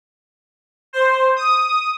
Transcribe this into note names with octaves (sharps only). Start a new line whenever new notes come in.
C5
D#6